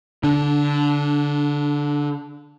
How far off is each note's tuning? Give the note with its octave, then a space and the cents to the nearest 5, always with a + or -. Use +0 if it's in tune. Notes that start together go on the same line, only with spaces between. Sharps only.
D3 -20 D4 +0